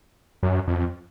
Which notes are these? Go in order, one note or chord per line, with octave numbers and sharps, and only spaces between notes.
F#2
F2